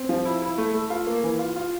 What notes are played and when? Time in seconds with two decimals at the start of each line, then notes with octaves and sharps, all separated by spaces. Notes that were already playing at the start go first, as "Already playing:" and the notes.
Already playing: C4
0.09 F3
0.25 E4
0.42 E4
0.58 A3
0.74 A3
0.90 F4
1.07 A#3
1.24 E3
1.39 F4
1.56 F4